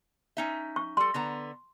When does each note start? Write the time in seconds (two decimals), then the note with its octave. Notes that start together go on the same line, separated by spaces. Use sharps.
0.37 C#4 D#4 E5
0.76 C#6
0.97 G3 A4 C6
1.14 D3 B3 A#5